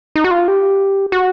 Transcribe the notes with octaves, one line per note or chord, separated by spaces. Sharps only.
D#4
F#4
F4
G4
F#4